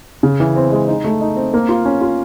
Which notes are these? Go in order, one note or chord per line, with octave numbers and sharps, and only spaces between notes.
C#3
E3
C4
G#3
D#4
A3
D#4
C4
A#3
F4
C#4
F4